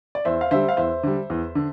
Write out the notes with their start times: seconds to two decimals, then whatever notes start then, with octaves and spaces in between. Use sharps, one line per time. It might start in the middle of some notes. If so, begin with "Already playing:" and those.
0.15 D5
0.25 E2 C5 E5
0.41 F5
0.51 D3 G3 C5 E5
0.69 F5
0.77 E2 C5 E5
1.03 D3 G3
1.30 E2
1.55 D3